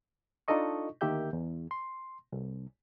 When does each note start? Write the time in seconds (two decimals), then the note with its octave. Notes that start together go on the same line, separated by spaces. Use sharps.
0.48 D4 D#4 F4 A4 D#5 C#6
1.01 D2 D#3 A#3 G4 E5 G6
1.33 E2
1.71 C6
2.32 C2